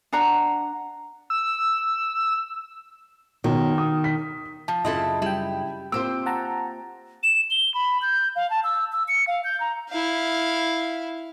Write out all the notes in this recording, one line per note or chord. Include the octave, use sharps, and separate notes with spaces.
D4 F#5 A#5
E6
B2 D#3 C#5
D#6
B6
F3 A5
F#2 C#3 C4 E4 F4 A4 D#5
G3 E4 G5
A#3 C4 F4 G4 C5 E6
F#5 A5 A#5
E7
G7
B5
G6
F5
A5
E6
E6
C#7
F5
G6
A#5
E4 F5